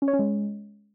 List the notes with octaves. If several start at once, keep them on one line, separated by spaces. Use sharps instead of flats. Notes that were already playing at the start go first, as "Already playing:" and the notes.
C#4
C#5
C#4
G#3